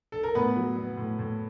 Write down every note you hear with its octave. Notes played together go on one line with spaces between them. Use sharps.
A4
A#4
A2 B3 B4
F#3
B3
A2
A2